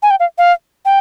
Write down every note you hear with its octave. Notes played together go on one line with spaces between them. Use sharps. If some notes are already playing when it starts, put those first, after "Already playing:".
G#5
G5
F5
F5
G5